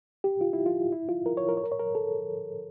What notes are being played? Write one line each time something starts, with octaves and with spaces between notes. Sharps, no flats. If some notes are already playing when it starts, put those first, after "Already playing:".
G4
F4
E4
F4
E4
F4
A#4
C#5
A#4
C#5
A#4
C#5
A#4
A4